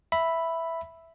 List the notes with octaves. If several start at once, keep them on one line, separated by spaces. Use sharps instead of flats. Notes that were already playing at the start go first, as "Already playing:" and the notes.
E5 B5